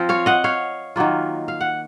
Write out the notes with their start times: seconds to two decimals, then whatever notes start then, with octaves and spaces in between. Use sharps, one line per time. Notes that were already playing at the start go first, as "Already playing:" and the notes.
Already playing: F3 C4 F4
0.09 C#5 F5
0.26 D#5 F#5
0.44 C#5 F5
0.96 D#3 F#3 A#3 F4
1.48 F5
1.61 F#5